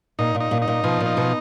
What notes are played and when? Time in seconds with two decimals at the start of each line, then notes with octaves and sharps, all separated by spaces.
0.19 A#2 D#4
0.35 A#2
0.40 D#4
0.51 A#2
0.62 D#4
0.68 A#2
0.84 B2 F3
1.00 A#2
1.06 D#4
1.17 B2